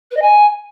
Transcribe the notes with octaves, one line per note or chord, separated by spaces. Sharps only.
B4
D#5
G#5